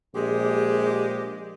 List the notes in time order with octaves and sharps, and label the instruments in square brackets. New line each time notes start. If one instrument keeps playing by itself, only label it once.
[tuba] A#1 [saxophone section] G#3 G4